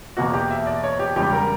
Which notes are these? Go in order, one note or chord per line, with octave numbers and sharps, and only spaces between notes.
E2 B2 A#3 F#4
G4
E5
D5
C#5
G4
E1 E2 C#3 G3 G4
A#4